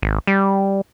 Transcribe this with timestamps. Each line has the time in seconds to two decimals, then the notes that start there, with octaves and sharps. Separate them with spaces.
0.02 G#1
0.27 G3